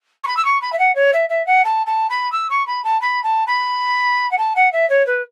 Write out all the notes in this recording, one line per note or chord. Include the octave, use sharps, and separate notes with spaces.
C#6
B5
E6
C#6
B5
E5
F#5
C#5
E5
E5
F#5
A5
A5
B5
E6
C#6
B5
A5
B5
A5
B5
F#5
A5
F#5
E5
C#5
B4